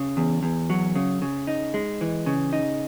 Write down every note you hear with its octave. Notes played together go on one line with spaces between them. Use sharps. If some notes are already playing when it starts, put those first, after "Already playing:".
Already playing: C#3
E2
E2
F#3
C#3
C#3
D#4
G#3
E3
C#3
D#4